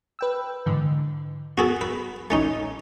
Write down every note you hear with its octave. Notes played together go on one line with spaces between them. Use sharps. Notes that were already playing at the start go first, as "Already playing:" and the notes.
B4 G5 E6
G#2 D3 E3
B3 F#4 G#4 A4
B4
A#1 E3 A3 C#4 D#4 G#5